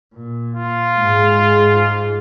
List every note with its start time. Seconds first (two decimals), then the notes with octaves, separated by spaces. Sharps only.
0.14 A#2
0.54 F4
0.97 G#2 G#3